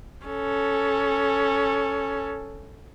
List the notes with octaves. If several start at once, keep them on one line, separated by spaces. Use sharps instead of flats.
C#4 A4